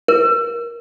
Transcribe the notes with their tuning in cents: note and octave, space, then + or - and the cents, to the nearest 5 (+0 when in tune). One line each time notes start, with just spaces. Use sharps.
A#4 +15